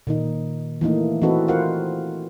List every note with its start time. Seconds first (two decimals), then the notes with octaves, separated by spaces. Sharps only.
0.07 A#2 D#3 D#4
0.81 E3 A3 A#3 D#4
1.22 E3 C4 D#4 F#4 A4 B4
1.48 F4 A#4 C5 F5 F#5